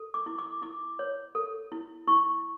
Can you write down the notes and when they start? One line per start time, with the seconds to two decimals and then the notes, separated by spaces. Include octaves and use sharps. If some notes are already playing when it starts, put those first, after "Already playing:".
Already playing: A4
0.14 D6
0.26 E4
0.38 D6
0.62 E4 D6
0.99 C#5
1.35 A4
1.72 E4
2.07 E4 C#6